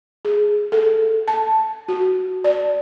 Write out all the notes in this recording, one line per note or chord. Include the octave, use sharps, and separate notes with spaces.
G#4
A4
A5
F#4
D5